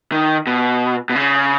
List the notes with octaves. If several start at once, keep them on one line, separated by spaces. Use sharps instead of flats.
D#3
B2
B2
C#3